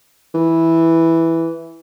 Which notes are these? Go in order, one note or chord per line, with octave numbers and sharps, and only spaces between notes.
E3